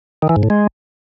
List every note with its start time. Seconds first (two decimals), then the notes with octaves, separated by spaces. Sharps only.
0.22 D#3
0.29 E3
0.36 G#2
0.43 A2
0.50 G#3